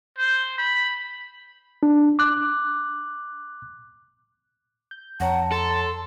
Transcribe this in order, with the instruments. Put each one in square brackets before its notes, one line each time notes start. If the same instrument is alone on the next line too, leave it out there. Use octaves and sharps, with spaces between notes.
[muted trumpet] C5
B5
[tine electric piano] D4
D6 F#6
[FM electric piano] G6
[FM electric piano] F2 C#5 A#5 [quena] F#5 [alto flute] A5
[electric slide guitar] A4 [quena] C6